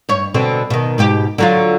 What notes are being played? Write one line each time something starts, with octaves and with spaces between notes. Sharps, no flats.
G2 C#5
B2 D3 C4
B2 D#3
G#2 B2 G4
D3 F#3 F4